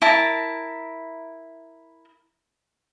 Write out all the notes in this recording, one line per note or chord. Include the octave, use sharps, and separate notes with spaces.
E4 A#4 A5 A#5